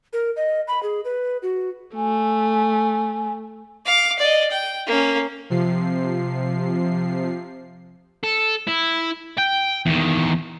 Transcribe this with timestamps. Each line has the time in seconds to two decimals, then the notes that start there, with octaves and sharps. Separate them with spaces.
0.13 A#4
0.36 D#5
0.68 B5
0.83 G#4
1.05 B4
1.43 F#4
1.96 A3 G#5
3.86 F5 D6
4.19 D5 D#5
4.51 G5
4.87 A#3 C#4
5.50 C3 F3 C7
8.23 A4
8.67 E4
9.38 G5
9.86 E2 D#3